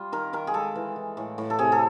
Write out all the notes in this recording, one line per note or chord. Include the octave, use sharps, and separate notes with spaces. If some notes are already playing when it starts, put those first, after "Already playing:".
Already playing: G3 F4
D#3 A#4
D#3 A#4
G#4
G#3 A4
E3
E3
A2
A2
A4
C3 G#4
A4